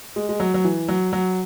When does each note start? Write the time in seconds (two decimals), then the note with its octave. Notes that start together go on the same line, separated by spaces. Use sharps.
0.16 G#3
0.29 G#3
0.40 F#3
0.54 F#3
0.64 E3
0.88 F#3
1.13 F#3